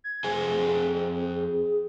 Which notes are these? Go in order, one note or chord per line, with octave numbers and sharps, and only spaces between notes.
G#6
F2 G#4 C5 G#5